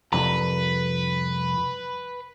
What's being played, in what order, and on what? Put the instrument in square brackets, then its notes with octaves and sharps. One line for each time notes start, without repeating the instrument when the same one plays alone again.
[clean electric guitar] C2 F2 A#5 [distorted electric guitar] B4